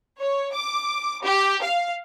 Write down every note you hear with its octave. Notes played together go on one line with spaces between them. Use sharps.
C#5
D6
G4
F5